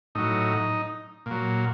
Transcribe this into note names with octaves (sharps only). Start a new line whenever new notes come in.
A2 F#3 D#4
A#2 F#3